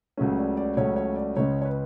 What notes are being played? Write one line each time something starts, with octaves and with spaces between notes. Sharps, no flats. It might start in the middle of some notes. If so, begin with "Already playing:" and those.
C#2 C#3 F#3 A3 C#4
D5
D5
C#2 C#3 F#3 A3 C#4 C#5
C#5
D5
C#2 C#3 G#3 C#4 C#5
C#5
B4